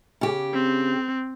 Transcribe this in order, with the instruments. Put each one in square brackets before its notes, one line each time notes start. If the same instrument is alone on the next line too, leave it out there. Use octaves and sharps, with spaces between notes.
[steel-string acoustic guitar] C#3 G4
[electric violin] C4